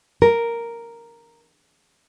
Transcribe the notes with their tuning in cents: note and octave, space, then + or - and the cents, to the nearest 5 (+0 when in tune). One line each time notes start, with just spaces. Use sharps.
A#4 +0